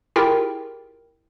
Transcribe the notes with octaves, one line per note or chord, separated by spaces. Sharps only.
E4 F4 G4 G#4 A#4 G5